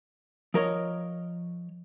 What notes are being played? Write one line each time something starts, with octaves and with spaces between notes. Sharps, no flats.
F3 A#4 C#5 D#5